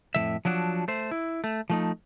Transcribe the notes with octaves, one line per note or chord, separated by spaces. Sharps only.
F2 A2 D#3 E5
F3 F#3 D4 F#4
A3 C5
E4
A3
F3 A3 D#4